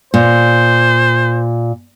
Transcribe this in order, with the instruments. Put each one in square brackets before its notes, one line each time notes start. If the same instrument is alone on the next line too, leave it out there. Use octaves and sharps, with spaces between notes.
[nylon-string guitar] A#2 [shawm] C5